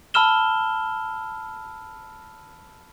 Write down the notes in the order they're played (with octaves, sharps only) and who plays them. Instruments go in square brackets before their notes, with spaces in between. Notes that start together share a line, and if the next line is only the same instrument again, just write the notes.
[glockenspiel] A5 B5 E6 F6 E7 G7